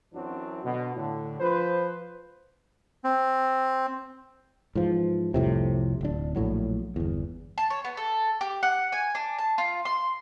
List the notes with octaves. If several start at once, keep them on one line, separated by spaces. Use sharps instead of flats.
F#2 E3 F#3 C4 D4 F#4
B2 D3 F#3
A2 D3
F3 B4 C5
C4
G#2 E3 F3
C2 F2 A2 C3
D1 D4
A#1 A2 F#3
G1 E2
A5
C#5
B3
A4
G4
F#5
G#5
D4
A5
F4
C6